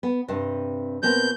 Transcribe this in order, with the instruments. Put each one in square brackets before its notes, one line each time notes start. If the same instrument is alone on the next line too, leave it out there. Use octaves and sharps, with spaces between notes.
[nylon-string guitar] B3
G2 C3
[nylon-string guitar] B2 A#3 C4 [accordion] G6